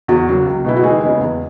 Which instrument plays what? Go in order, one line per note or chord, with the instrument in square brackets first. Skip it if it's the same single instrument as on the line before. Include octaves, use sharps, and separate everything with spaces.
[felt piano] E2 F#4
C#3 F#3 A#3
C#2
B2 G#3 B3 E4
F#4
D#2 G#3 G#4
C#3 G#3 B3
E2